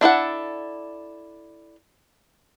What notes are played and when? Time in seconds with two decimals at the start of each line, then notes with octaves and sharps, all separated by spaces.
0.01 D4 E4 A4 F#5